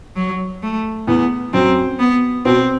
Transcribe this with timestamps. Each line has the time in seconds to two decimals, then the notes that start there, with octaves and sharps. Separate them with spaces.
0.16 F#3
0.63 A3
1.07 E2 E3 B3
1.53 F#2 F#3 C4
1.99 B3
2.45 B2 B3 C4